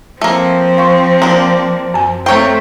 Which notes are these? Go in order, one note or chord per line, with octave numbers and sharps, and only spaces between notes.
F3 A3 A#3 C4
F5 C6 C#6
A#3 D4
F#2 G#5
A3 A#3 C4 C5 C#5 G5 C#6 G6